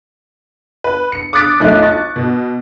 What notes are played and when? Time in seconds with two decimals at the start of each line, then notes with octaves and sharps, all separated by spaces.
0.84 B4
1.12 C#7
1.33 D6 D#6 F#6 A6 B6 D7
1.60 B1 F2 A3 D#4 F#6
1.83 C#6 A6
2.16 B2